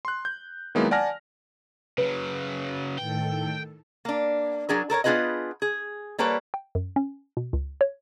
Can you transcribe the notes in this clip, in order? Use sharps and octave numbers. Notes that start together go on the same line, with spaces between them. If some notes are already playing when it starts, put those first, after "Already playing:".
C6 F#6
G6
D#3 F#3 G#3 A#3 B3 E4
D5 F#5 G#5 A5 F6 A#6
C#3 F#3 B4
A2 D#3 A4 G5
A#3 D4
F#3 D4 G#4 A#4
A4 A#4 C5 C#5
B3 D4 F4 G#4 B4 D#5
G#4
G3 A#3 A4 B4 C#5
G5
F#2
C#4
B2
C#2
C#5